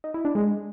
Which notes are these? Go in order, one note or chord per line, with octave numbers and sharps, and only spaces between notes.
D#4
E4
D4
G#3